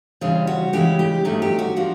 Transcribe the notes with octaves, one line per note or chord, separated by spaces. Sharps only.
D#2 C#3 E3 G3 C4 G#4
F#4
C#3 E3 G#3 C#4 G4
G4
G2 D#3 F#3 A3 C4 G#4
G4
F#4
F3 A#3 D4 F#4